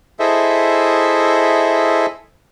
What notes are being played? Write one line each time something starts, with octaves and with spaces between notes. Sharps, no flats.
E4 G#4 A4 C5 D#5 E5